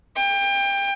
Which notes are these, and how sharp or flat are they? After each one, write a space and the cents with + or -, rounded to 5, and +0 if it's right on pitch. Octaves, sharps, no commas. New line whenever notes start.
G5 +25